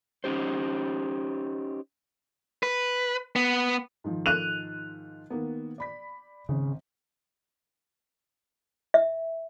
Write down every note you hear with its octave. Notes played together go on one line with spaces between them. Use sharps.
C#4 D#4 G4 C5
B4
B3
G#2 D#3 F3
F#6 D#7 F7
D#3 A#3 B3
D5 B5 B6
G#1 C#3
E5